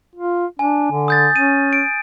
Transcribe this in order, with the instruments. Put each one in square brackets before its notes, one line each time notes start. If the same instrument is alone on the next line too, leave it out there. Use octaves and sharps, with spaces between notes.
[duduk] F4
[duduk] D4 [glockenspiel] G#5
[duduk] D3
[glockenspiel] D#6 G6 A6
[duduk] C#4 [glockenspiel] D#7
[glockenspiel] D7